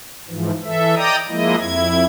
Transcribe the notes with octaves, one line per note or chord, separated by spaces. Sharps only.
G#2 E3 F3
E3 A4 E5
D5 D#5 G5 A#5 D#6
F3 G#3 A#3 E4 D#5
F2 E4 G#6